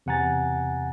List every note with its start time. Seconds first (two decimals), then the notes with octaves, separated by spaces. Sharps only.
0.06 E2 C3 F#5 G#5 A#5 A6